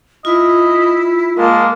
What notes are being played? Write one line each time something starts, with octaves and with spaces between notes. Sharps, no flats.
E4 F4 D#5
G#3 A#3 A5